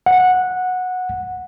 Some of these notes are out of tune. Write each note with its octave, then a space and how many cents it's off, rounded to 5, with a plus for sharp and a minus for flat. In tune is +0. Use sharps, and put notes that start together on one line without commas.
F#5 -10